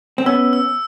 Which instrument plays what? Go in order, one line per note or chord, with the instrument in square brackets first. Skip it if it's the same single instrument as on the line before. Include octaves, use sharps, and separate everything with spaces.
[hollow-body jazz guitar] C4
[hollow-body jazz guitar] B3 C#4 [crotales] E6
[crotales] E6